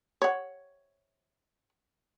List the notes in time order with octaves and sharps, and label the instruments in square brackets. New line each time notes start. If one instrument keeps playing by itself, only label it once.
[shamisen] C#5 F#5